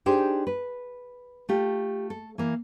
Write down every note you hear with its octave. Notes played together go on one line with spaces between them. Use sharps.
D4 D#4 G4 G#4 C5
B4
A3 F4 G4
A4
E3 A#3